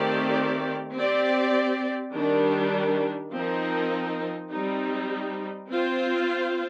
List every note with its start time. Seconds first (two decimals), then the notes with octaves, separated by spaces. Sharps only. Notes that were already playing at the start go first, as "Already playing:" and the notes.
Already playing: D#3 A3 C4 G4 D5
0.94 C4 G4 D5
2.13 D#3 G3 D4
3.31 F3 C4 D#4 A#4
4.50 G3 C4 D#4
5.69 C4 F4 C5